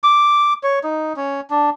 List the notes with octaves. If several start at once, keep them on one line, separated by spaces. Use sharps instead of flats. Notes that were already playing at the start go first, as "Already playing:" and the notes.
D6
C#5
D#4
C#4
D4